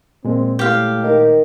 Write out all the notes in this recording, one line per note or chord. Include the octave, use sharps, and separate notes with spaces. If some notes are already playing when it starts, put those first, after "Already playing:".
A#2 G#3 C4
A2 G4 F5
D#3